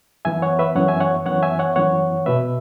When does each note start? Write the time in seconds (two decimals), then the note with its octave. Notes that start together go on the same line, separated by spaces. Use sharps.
0.25 F#2 E3 B3 E5 G#5
0.42 C#5 F#5
0.59 B4 E5
0.75 F#2 E3 B3 C#5 F#5
0.88 E5 G#5
1.00 C#5 F#5
1.26 F#2 E3 B3 C#5 F#5
1.43 E5 G#5
1.59 C#5 F#5
1.76 F#2 E3 B3 C#5 F#5
2.26 B2 B3 B4 E5